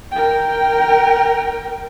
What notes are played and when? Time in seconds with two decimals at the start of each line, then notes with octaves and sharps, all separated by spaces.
0.12 A#4 G5